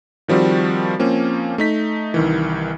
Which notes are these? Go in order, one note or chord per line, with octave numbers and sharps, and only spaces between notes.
D#3 F3 G3 C4 F#4
F3 A#3 C4 C#4
A3 D#4 B6
C2 D#3 E3